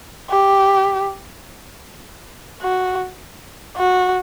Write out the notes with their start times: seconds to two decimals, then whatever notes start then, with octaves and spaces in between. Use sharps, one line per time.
0.30 G4
2.62 F#4
3.77 F#4